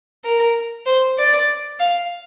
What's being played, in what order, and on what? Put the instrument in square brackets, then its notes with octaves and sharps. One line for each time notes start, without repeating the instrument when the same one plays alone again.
[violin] A#4
C5
D5
F5